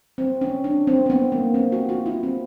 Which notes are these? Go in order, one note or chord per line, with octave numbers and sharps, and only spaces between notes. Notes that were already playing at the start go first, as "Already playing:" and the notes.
C4
C#4
D4
C4
C4
B3
A#3
C4
F#4
F4
E4
C4